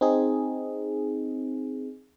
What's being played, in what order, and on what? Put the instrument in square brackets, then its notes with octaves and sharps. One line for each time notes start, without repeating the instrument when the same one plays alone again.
[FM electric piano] C4 D#4 G#4